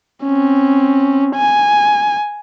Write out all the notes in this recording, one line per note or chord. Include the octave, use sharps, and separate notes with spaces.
C4 C#4
G#5